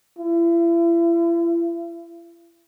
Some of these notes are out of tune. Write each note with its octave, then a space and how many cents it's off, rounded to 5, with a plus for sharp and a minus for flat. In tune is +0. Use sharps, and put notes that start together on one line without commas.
E4 +40